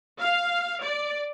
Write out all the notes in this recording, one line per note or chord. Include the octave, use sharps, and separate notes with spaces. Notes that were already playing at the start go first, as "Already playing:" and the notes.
F5
D5